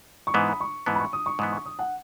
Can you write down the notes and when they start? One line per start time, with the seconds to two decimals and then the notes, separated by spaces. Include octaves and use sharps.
0.27 C#6
0.34 G#2 E3 B3 D#6
0.49 B5
0.60 C#6
0.86 G#2 E3 B3 A5
0.95 B5
1.00 C#6
1.13 D#6
1.26 C#6
1.39 G#2 E3 B3 D#6
1.52 C#6
1.65 D#6
1.79 F#5